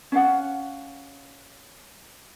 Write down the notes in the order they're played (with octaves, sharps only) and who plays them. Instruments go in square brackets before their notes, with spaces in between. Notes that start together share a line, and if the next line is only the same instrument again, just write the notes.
[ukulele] C#4 F5 F#5